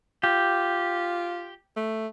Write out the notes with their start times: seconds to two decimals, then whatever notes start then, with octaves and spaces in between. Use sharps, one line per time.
0.24 F4 G4
1.77 A3